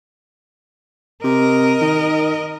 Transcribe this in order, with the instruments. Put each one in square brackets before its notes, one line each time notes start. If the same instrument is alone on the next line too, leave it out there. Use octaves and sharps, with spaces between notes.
[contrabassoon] C3 [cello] A#4 D#5
[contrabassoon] D#3